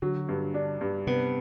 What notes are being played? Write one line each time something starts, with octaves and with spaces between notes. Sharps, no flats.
D3 F#3
G2
D4
G2
C3 B3